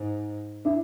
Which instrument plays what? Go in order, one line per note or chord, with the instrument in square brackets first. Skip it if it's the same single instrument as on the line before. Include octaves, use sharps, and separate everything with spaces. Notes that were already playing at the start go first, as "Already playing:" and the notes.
Already playing: [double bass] G#2
[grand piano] D4 E4